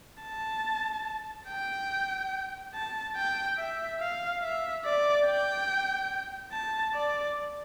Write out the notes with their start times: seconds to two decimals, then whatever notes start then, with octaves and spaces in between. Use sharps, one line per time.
0.23 A5
1.49 G5
2.74 A5
3.16 G5
3.58 E5
4.00 F5
4.42 E5
4.85 D5
5.27 G5
6.52 A5
6.95 D5